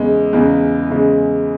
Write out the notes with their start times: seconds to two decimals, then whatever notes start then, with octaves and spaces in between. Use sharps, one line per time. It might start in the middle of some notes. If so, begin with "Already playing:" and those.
Already playing: E2 C#3 G#3
0.33 E2 C#3 G#3
0.90 E2 C#3 G#3